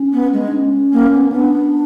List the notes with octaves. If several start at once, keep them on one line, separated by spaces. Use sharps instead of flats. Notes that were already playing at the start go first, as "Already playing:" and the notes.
Already playing: C#4
B3
G#3
D4
C#4
A#3
B3
B3 D4